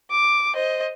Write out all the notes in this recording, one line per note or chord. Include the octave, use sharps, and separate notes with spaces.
D6
C5 D#5